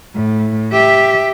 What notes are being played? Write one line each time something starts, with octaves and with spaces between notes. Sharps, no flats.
A2
G4 E5